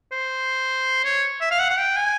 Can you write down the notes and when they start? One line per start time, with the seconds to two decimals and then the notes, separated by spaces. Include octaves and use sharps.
0.12 C5
1.05 C#5
1.41 E5
1.51 F5
1.59 F#5
1.70 F#5
1.79 G5
1.96 G#5